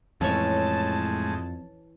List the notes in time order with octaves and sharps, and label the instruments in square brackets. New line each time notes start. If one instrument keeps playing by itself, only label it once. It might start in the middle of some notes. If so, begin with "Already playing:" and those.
[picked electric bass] F2 [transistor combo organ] A2 G#3 [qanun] E3 C#4 C#5 [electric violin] A5